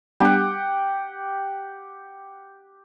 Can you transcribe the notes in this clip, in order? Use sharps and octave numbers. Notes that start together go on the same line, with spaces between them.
G3 B3 D4 G4 F#5